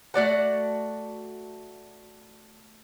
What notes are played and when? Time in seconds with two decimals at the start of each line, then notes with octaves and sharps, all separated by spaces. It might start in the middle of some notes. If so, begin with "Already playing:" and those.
0.14 A3 F#4 D5 F#5